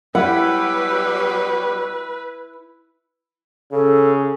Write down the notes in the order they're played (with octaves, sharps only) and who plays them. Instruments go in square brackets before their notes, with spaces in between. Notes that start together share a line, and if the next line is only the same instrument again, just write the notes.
[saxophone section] B2 F#3 G3 [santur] E4 [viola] B4 [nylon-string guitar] F#5
[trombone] C#3 [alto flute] A4